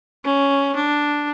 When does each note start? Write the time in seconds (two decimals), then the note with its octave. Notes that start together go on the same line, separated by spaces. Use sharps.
0.25 C#4
0.75 D4